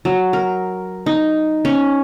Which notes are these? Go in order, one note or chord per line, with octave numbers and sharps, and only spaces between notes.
F#3
A#4
D#4
C#4